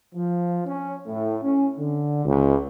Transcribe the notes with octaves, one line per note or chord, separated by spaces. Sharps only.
F3
C#4
A2
C#4
D3
C#2